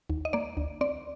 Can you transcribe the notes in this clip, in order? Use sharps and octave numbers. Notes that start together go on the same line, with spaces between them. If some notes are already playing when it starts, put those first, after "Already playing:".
D#2
D#5
A#3 D5
D2
C4 D5